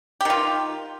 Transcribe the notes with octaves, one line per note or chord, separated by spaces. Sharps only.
D#3 F4 G4